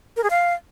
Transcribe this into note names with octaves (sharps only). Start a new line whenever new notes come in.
A#4
G#4
F5